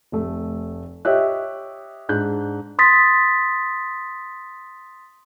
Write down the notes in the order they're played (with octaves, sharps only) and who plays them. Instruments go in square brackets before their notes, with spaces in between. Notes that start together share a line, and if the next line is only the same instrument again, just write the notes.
[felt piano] F1 A3
G4 C#5 D#5 E5 F#6
G#2 D4 F#6 G6
[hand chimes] C6 D#6 A6 B6